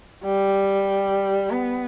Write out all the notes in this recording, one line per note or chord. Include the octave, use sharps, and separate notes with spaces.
G3
B3